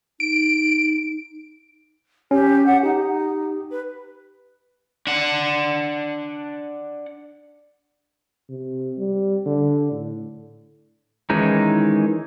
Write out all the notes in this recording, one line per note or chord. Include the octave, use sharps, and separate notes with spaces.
D#4 D7
C#4 G4
F#5
D#4 G4
B4
D4 F#5
C3
G3
D3
A2
D#3 E3 G#3 C#4 D#4